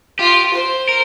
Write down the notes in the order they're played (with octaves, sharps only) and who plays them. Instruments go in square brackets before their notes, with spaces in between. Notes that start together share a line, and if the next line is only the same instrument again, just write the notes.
[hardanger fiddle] F4 [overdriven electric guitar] G4
[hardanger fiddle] C5
[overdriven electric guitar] A#4